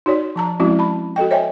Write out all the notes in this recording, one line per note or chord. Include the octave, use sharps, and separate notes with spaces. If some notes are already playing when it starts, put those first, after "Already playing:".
D#4 F#4 C#5 D5
F3 A5 A#5
F3 G#3 C4 C#4 E4 F#4
A5 B5
F#4 A4 D#5 G5
C5 C#5 D#5 E5 G5 G#5